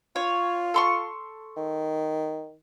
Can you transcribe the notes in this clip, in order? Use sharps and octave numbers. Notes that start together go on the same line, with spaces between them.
F4 C#5
A4 C6 C#6
D#3